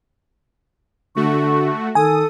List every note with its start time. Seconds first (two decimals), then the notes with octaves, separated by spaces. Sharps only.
1.16 D3 A3 F#4 C#6
1.95 D#3 A4 G#5 D#6